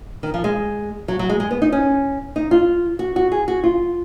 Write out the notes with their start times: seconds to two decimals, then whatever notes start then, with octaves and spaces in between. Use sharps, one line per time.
0.23 D#3
0.34 F3
0.44 G#3
1.08 F#3
1.19 F#3
1.29 G#3
1.40 G#3
1.51 B3
1.62 D#4
1.72 C#4
2.36 D#4
2.51 F4
2.99 F#4
3.16 F#4
3.32 G#4
3.48 F#4
3.64 F4